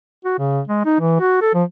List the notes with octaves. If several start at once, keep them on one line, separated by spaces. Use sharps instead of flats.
F#4
C#3
G#3
D#4
E3
F#4
A4
F3